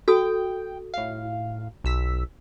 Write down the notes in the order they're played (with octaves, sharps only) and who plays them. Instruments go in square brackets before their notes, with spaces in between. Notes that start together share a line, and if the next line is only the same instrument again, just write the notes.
[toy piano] F#4 A4 D#6 [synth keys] G5
[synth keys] A2 F5
B1 E6 B6